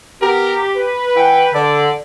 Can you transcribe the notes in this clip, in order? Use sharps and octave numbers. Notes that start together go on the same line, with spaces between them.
B3 G4 A#4
B4
E3 F#5 G5
D3 A4 D5